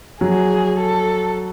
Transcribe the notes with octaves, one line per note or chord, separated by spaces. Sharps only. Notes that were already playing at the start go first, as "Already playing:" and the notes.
F#3 G#4
A4